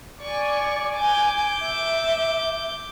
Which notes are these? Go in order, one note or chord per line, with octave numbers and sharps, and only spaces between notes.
D5 G#5 C#6
G#5 D6 G6
E5